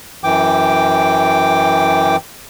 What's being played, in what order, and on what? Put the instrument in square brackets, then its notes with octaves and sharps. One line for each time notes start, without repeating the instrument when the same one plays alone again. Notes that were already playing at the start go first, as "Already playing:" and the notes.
[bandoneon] F#2 E3 G5 D6